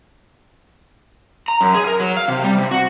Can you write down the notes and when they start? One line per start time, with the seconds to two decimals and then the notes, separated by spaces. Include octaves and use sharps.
1.48 A#5
1.61 F#2
1.75 G#4
1.87 A#4
2.00 F#3
2.17 F5
2.28 C3
2.44 G3
2.58 C3
2.71 F#4